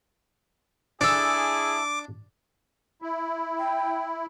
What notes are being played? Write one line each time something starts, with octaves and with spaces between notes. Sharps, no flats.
D4 E4 G#4 A4 D6 E6
E4
G5